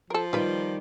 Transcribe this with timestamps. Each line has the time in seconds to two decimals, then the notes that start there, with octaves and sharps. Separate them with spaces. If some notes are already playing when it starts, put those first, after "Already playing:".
0.10 F3 A4 A#4
0.33 D#3 G3 D#4 F4 B4